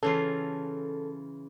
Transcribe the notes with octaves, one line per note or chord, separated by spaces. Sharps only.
C#3 E3 F4 A4